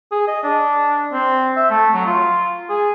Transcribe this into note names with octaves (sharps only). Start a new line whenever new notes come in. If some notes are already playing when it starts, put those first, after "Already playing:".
G#4
D#5
D4
C4
E5
A3
F#3
F4
G#4